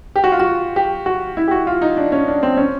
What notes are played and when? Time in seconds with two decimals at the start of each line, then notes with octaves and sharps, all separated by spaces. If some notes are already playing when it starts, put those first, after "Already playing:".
0.16 G4
0.24 F#4
0.32 F4
0.40 F#4
0.76 G4
1.06 F#4
1.37 E4
1.48 G4
1.51 F#4
1.67 F4
1.81 D#4
1.97 D4
2.12 C#4
2.28 D4
2.43 C4
2.57 C#4